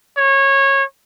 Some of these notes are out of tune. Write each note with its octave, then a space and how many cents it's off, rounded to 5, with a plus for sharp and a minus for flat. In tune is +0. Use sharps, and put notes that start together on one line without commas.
C#5 -20